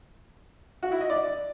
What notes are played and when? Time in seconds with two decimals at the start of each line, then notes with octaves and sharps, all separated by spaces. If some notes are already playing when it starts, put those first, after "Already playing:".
0.83 F#4
0.92 E4
1.01 D#5
1.10 D5